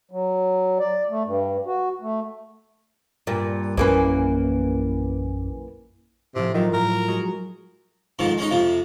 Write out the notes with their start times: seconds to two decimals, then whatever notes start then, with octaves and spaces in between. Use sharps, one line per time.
0.11 F#3
0.79 D5
1.10 A3
1.25 G2
1.66 F#4
2.02 A3
3.27 G2 A#2
3.77 A#1 F#2 E3 A#3 C#4 B4
6.35 A2 C3 F3
6.54 D#3 F#3 E4 F4
6.73 A2 A#4
7.08 G#3 F#4
8.19 F2 G#2 D#3 F3
8.38 G#3 C#4 D#4
8.51 F2 C3 F3